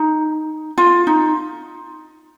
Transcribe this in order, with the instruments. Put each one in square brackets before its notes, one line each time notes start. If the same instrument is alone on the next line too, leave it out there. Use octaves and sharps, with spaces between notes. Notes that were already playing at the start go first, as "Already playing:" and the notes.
Already playing: [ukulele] D#4
F4
D#4